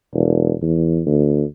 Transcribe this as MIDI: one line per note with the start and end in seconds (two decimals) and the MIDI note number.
0.14 0.54 28
0.62 1.01 40
1.06 1.43 38